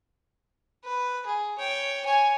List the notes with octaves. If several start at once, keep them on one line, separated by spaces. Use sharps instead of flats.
B4
G#4
C#5 G5
C#5 G#5